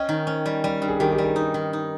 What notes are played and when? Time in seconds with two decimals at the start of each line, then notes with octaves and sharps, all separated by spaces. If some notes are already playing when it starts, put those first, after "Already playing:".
Already playing: C#4 D#5 G5
0.09 D#3
0.27 C#4
0.46 G3
0.64 G3
0.82 G2
0.88 G#4
1.00 D#3 G4 A#4
1.12 G4
1.18 G3
1.24 G#4
1.36 D#4
1.54 D#3
1.73 D#4